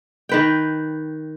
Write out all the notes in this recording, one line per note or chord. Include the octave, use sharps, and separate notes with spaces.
D#3 B4 G5